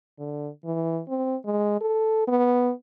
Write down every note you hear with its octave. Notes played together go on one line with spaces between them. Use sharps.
D3
E3
C4
G#3
A4
B3